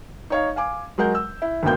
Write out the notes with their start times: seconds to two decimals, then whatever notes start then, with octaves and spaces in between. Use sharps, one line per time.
0.30 D#4 C#5 F5
0.56 F5 G#5 D6
0.98 F#3 G#3 A#4 F#5 G6
1.15 E6
1.42 E4
1.63 G#1 D2 B2 A#3 G5 G6